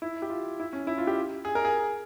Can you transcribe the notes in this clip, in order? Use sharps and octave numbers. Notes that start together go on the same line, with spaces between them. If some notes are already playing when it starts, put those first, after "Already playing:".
E4
G4
F4
E4
C#4
E4
F4
G4
G#4
A#4
G#4